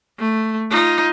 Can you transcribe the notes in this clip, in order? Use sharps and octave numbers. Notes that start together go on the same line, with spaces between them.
A3
D#4 F4